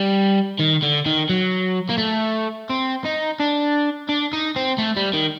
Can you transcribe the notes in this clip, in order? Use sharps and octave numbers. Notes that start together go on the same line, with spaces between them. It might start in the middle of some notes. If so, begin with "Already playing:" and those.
Already playing: G3
D#3
D3
D#3
F#3
A#3
A3
C4
D#4
D4
D4
D#4
C4
A3
G3
D#3